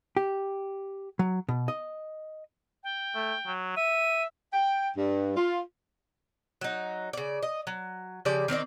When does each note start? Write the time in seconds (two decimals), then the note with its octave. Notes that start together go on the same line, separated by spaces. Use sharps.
0.17 G4
1.19 F#3
1.49 B2
1.68 D#5
2.84 G5
3.14 A3
3.46 F#3
3.77 E5 D#7
4.53 G5
4.97 G2
5.37 F4
6.61 F#3 D#4
7.13 C#3 D5
7.43 D#5
7.67 F#3
8.25 C#3 F3 G4 D5
8.48 D#3 C4 D#4 D5